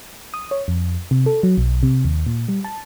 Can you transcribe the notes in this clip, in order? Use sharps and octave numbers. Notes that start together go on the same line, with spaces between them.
D#6
C#5
F2
C3
A4
F#3
B1
C3
D#2
A#2
G3
A5